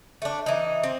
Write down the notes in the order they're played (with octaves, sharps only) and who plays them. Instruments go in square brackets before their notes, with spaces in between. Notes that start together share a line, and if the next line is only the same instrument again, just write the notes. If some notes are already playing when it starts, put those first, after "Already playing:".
[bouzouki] A3 D4
E3 D#4
C4